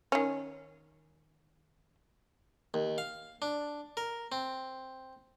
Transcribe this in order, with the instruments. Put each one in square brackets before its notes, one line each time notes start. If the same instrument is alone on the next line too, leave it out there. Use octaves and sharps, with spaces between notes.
[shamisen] D#3 C#4
[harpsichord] D#2
F5
D4
A#4
C4